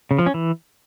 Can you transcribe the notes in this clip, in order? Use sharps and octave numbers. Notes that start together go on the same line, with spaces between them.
C#3
F3
C#4
E3